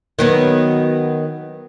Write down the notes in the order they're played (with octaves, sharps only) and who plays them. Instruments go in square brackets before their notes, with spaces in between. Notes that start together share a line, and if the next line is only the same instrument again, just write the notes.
[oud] D#3 F#3 B3